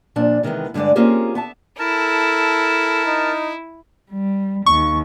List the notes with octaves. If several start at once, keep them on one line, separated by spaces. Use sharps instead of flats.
A#2 F3 D4
C3 D#3 E3 G#3 B3
G2 D3 F#3 G#3 D5
A#3 C4 C#4 F4 G4 G#4
B3 E5 A5
E4 A4 A#4 A5
D#4
G3
D#2 C#6